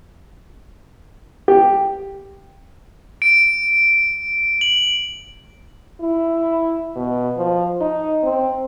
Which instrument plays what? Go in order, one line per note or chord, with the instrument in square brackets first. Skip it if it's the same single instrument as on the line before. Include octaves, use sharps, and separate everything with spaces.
[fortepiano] G4
[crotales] D7
F#7
[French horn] E4
B2
F3
D#4
C4